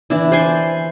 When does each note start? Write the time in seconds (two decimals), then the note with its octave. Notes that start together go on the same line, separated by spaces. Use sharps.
0.10 E3 D4 E4
0.32 C5 D5 G#5 C6